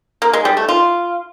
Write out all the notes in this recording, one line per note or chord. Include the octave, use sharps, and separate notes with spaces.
A#3
G#3
G3
A3
F4